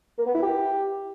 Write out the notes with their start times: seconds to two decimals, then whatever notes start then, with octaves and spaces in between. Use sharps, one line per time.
0.18 A#3
0.26 B3
0.34 E4
0.43 G4